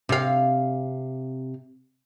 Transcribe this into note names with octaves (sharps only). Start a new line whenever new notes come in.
C3 F5